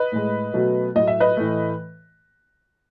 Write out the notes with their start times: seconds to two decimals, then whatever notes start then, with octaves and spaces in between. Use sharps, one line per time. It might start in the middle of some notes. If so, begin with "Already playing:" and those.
Already playing: B4 D#5
0.12 A2 G#3
0.54 B2 F#3 A3
0.95 A2 F#3 A3 D#5
1.07 E5
1.20 B4 D#5
1.37 A2 E3 A3